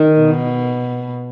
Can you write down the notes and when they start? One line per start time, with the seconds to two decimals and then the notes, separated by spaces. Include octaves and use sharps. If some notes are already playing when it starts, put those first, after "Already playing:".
Already playing: D#3
0.20 B2